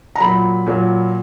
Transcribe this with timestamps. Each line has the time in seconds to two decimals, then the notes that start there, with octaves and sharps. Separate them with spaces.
0.15 A#5
0.20 A#2 F#3 B5
0.66 A#2 F#3